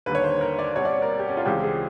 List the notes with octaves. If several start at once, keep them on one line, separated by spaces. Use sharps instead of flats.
D#2 D3 G3 A#3 B4
C#5
C5
A#4
D5
B2 G3 C4 C#5
D5
C#5
A#4
G4
C#4
F4
C#2 C#3 E3 G#3 C4 G4
G#4